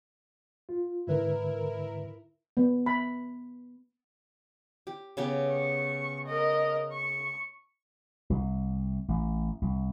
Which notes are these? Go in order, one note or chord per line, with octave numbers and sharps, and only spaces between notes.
F4
G#2 D3 E4 A#4 B4
B3
B5
G4
C#3 B3 G4
C#6
A#4 D#5
C#6
C2
A1
C2